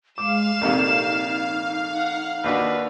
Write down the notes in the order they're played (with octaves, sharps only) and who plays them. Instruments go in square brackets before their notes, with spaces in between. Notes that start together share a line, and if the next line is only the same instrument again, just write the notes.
[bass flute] G#3 [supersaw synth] F5 [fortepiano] D6 [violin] E7
[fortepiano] A#1 F2 C3 [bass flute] D#4
[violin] F#5
[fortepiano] D#2 D4 F#4 [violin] B4